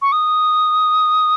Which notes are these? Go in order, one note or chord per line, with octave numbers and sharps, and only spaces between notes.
C#6
D#6